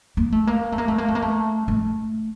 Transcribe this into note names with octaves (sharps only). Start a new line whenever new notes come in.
A#3
A3
A#3
A3
A#3
A3
A#3
A3
A#3
A3
A3